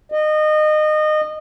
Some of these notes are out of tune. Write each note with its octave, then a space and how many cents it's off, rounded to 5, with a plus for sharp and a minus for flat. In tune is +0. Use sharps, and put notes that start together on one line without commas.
D#5 -25